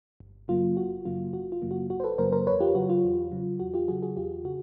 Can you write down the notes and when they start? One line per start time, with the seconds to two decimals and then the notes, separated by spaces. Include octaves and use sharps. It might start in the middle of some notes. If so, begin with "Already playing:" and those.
0.20 G1
0.48 F#2 C#3 F#3 A#3 F4
0.77 G1 F#4
1.05 F#2 C#3 F#3 A#3 F4
1.33 G1 F#4
1.52 F4
1.62 F#2 C#3 F#3 A#3
1.71 F#4
1.90 G1 F#4
2.00 C5
2.04 A4 B4
2.18 F#2 C#3 F#3 A#3 A#4 C5
2.32 A#4 C5
2.46 E2 B4 C#5
2.60 F4 G4
2.75 C#3 F#3 F#4
2.89 F4
3.04 E2
3.32 C#3 F#3
3.60 E2 F#4
3.74 F4 G4
3.88 C#3 F#3 F#4 G#4
4.02 F#4 G#4
4.16 E2 F4 G4
4.45 C#3 F#4